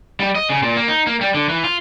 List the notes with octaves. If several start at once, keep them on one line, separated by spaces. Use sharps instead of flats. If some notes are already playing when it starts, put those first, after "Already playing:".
G3
D#5
C#3
A#2
A#3
D#4
A#3
G3
D3
E3
F4